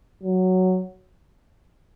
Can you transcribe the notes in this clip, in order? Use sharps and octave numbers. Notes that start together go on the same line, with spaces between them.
F#3